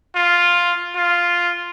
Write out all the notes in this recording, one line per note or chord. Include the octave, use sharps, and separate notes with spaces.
F4
F4